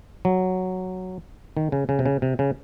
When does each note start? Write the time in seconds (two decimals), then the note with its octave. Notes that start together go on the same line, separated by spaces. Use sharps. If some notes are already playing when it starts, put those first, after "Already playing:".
0.25 F#3
1.57 D#3
1.72 C#3
1.89 C#3
1.99 C3
2.06 C#3
2.22 C3
2.39 C#3